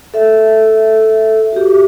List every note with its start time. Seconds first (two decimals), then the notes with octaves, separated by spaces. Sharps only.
0.14 A4 E5
1.53 F#4 G4